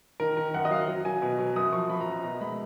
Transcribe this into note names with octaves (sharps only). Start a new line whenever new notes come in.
D#3 A#4
D#3 A#4
F#2 F#5
D#5
F#3 F5
F#3
F#3 G#5
B2
F#3
F#2 D#6
F3 C#6
F3 B5
A#5
F#2
A#5
B2 A#5
G#3 B5